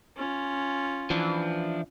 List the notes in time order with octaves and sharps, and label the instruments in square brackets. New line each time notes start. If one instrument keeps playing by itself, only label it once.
[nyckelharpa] C#4 F4
[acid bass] E3 [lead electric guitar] F3 D4